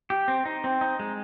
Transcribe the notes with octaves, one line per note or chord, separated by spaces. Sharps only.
G4
C4
D#4
C4
D#4
G#3